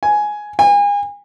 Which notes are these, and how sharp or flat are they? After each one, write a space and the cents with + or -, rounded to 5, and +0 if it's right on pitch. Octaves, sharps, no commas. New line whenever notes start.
G#5 +10
G#5 -35